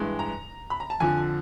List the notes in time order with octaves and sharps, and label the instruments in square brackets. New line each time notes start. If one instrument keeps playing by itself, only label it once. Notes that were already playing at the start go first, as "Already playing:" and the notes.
Already playing: [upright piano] G2 E3 G#3
A#5
B5
A#5
A5
F2 D3 F3 G#5